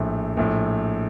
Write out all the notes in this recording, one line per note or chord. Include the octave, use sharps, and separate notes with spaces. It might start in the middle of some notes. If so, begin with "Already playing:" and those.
Already playing: A#1 A2 A3
A#1 A2 A3